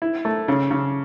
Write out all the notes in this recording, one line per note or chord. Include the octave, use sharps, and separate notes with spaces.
E4
A3
C#3
C#3